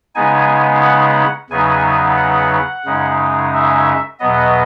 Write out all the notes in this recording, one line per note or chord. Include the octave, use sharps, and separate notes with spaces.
C#3 G#3 B3 D#4 G#5
F#5
E2 C#3 F#3 B3 D#4 G#5
F#5
F#2 C#3 G#3 D#4
E5
E2 B2 F#3 B3 D#5